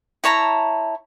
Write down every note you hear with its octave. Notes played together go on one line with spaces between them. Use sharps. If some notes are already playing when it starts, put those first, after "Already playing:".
E4 C#5 A5 A#5